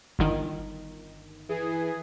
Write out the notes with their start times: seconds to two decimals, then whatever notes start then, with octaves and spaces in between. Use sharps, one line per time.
0.19 G1 D#3
1.49 E3 G#4